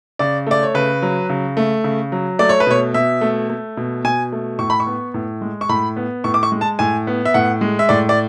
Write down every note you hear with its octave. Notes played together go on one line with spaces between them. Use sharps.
C#3 D5
A3 D5
C#5
C#3 B4
F#3
C#3
A3
C#3
F#3
A3 D5
C#5
B4
B2 C#5
B2 E5
A3
A3
B2
B2 G#5
A3
A2 C#6
B5
C#6
B3
A2
G#3
C#6
A2 B5
B3
A2 C#6
D6
C#6
G#3
A5
A2 G#5
B3
E5
A2 F#5
G#3
E5
A2 D5
D5